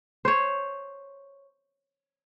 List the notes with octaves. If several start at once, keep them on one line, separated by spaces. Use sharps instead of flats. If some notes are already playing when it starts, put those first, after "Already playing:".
C5 C#5